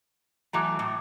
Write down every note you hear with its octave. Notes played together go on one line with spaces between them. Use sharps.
E3 F#3 A3 A#5 D6
A2